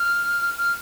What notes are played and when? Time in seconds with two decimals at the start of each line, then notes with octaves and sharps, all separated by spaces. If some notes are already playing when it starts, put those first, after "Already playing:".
Already playing: F6
0.58 F6